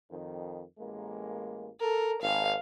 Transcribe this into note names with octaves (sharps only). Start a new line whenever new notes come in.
F2 D#3
A1 G#3 A#3
A4 A#4
G#1 F5